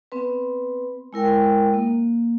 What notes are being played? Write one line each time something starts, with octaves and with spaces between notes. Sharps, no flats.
B3 C4 B4
G#3 E4 A#4 G5
A#3